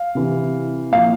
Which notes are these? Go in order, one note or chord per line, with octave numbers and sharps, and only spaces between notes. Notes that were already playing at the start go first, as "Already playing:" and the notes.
Already playing: F5
C3 E3
A#2 F3 F5